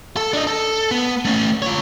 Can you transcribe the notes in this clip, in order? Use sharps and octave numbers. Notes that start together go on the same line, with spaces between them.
A4
D4 D#5
A4
B3
A3 C#4
F4 C#5